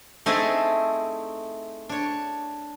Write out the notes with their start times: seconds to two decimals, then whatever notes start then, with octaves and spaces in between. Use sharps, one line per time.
0.26 A3 C4 D#4 E4 G#4 A5
1.89 D4 C#5